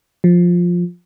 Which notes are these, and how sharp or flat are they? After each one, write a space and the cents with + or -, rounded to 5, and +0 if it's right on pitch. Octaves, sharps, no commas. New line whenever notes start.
F3 +10